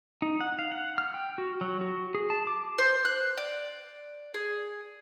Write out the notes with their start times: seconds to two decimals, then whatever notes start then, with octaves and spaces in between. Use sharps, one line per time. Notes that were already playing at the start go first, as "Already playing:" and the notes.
0.22 D#4
0.41 F#5
0.59 F5
0.72 F#5
0.98 F6
1.14 G5
1.38 F#4
1.61 F#3
1.81 F#4
2.15 G#4
2.30 A5
2.47 D6
2.78 C5
3.05 F#6
3.37 D5
4.34 G#4